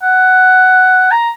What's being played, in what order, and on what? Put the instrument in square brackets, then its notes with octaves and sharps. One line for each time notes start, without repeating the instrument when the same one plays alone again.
[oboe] F#5
A#5